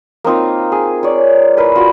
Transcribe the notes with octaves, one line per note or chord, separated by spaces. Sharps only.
A#3 C4 D#4 F4
G#4
C#5 D5
E4 A#4 B4
F4 F#4